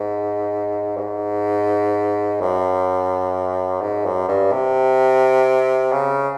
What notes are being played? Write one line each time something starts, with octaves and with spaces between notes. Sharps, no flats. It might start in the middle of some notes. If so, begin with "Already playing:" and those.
Already playing: G#2
G2
G#2
F#2
G#2
F#2
G2
C3
C#3